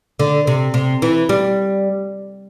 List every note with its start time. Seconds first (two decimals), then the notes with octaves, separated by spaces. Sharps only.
0.19 D3
0.47 C3
0.74 C3
1.02 E3
1.29 G3